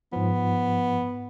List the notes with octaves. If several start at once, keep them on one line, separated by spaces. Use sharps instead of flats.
G#2 F3 B3